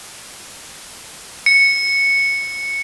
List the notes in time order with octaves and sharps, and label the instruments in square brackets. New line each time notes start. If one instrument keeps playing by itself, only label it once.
[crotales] C#7